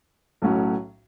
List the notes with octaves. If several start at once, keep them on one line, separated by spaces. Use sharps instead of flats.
B1 A2 F#3 C#4